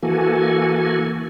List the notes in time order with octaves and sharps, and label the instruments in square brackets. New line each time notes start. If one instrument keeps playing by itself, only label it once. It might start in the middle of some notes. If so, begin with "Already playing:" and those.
[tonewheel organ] E3 A#3 F#4 A4 G#5